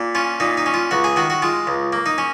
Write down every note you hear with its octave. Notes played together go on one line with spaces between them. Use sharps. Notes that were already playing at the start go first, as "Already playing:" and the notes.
Already playing: A#2
C#4 F4
A#2 D#4
D#4
C#4
F4
C#2 F#4
G#4
D#3 F#4
F#4
G#3 F4
C#2
A#3
D#4
C#4